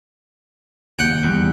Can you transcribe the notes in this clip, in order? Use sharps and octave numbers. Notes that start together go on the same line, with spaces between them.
F1 D#2 F#5 G5
E2 G3